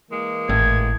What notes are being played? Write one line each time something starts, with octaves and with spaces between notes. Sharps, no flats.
E3 G#3 A#3
G#1 A2 G#6